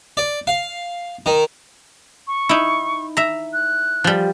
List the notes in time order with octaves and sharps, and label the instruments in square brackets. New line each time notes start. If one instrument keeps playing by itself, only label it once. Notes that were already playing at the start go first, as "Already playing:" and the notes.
[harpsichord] D5
F5
D#3
[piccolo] C#6
[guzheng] D#4 E4
E5 A#5
[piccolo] F#6
[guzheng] F3 G3